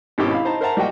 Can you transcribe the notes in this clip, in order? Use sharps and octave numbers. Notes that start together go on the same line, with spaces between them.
G#1 B2 D#3 C#4 E4 G4
E4 F5 B5
D#4 C5 A5 A#5
A#4 C5 E5 F#5 A5 A#5
G3 A#3 F#4 D#5 G5